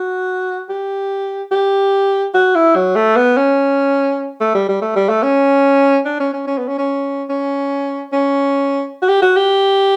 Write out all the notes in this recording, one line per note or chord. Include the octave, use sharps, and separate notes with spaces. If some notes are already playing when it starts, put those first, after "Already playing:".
Already playing: F#4
G4
G4
F#4
E4
F#3
A3
B3
C#4
A3
G3
G3
A3
G3
A3
C#4
D4
C#4
C#4
C#4
B3
C#4
C#4
C#4
C#4
F#4
G4
F#4
G4